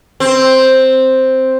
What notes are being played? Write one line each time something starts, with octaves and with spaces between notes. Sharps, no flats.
C4